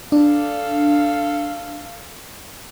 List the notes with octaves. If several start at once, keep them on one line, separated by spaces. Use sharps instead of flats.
D4 A4 F5